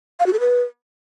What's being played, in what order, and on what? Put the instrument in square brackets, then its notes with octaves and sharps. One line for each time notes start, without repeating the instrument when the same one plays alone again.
[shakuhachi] F5
F#4
A4
B4